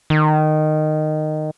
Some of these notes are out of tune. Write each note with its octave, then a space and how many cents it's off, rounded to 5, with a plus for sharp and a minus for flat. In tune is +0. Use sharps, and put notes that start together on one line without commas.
D#3 -15